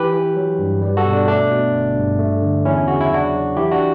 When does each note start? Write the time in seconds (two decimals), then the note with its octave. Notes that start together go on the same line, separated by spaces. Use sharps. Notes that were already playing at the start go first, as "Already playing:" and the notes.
Already playing: E3 G4 B4
0.13 E3
0.36 F#3
0.59 G2
0.82 G3
0.97 F#4 A4
1.05 B2
1.13 D4
1.28 A3 D4
1.51 B2
1.73 G1
1.96 G2
2.19 A3
2.42 D3
2.65 E2 C#4 E4
2.88 C#3 F#4
3.01 E4
3.10 F#3 D4 F#4
3.34 F#3
3.57 E3 E4 G4
3.71 D4 F#4